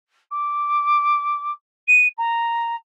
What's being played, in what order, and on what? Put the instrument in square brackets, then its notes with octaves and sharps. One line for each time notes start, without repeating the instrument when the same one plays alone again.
[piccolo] D6
D#7
A#5